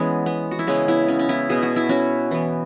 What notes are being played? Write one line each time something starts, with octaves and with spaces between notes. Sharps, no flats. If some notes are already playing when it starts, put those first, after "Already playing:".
Already playing: E3 G#3 B3 C#4
B3
F#4
E4
C#3 G#3 B3 C#4
B3 E4
C#4
C#4
B3 E4
B2 B3 G#4
F#4
E4
C#4 F#4
E3 B3